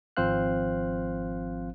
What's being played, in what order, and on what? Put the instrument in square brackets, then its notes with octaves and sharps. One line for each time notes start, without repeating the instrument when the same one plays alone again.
[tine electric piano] G#1 F3 C4 C5 F5 F#6